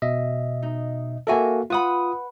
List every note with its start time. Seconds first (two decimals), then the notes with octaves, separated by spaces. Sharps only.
0.02 B2 D#5 E5
0.63 D#4
1.27 A#3 F#4 A4 A#4 E5 G#5
1.70 F4 B4 F#5 B5 D#6